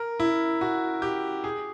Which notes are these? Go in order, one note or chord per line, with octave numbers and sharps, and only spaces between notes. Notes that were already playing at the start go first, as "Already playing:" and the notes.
Already playing: A#4
E4
F#4
G4
G#4